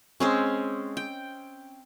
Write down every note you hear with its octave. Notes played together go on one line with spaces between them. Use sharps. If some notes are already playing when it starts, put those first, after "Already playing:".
G#3 C4 C#4
G5